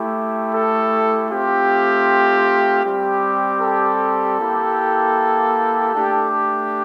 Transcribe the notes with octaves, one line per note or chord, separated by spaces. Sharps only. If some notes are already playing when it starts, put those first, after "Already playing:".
Already playing: A3 E4 G4
A4
A3 C4 F4 G4
G3 C4 G4
A4
A#3 E4 G4
A3 D4 G4